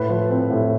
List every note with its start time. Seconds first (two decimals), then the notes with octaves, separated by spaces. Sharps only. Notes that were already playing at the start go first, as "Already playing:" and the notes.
Already playing: A2 B4
0.09 F3
0.30 C4
0.50 A2